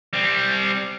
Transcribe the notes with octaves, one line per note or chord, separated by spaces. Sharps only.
G3 C4